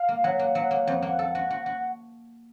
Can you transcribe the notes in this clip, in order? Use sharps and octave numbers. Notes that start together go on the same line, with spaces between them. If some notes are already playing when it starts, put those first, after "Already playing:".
Already playing: F5
A#3
F#3 F#5
A#3
F#3
A#3
F2
A#3
A4
F#4
F#4
F#4